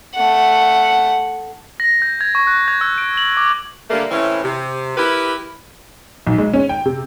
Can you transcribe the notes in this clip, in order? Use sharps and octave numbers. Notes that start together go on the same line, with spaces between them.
A3 F#5
A#6
G6
G#6
C#6
F#6
G#6
E6
D7
F#7
D6
D3 G3 A3 A#3
A2 E3 C4 C#4 E4
C3
E4 G4 A#4 B4
B1
G#3
C#4
G5
C3